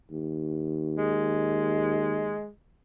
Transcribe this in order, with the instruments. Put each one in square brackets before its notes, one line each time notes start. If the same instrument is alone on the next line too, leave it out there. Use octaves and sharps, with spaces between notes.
[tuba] D#2
[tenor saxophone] G#3